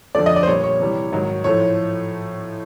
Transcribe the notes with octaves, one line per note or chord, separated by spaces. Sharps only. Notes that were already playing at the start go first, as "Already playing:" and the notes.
F2 D3 F3 A3 D5
D#5
D5
C5
A#2 G3 C#5
C#5
C3 E3 G3
G#2 D#3 F#3
A2 F3 A3 C#5